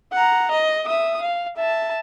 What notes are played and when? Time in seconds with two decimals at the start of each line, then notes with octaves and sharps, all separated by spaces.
0.12 F#5 A#5
0.51 D#5
0.86 E5 D#6
1.21 F5
1.57 E5 A5